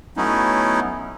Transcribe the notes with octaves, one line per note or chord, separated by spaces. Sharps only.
F#3 A3 B3 C#4 D#4 E4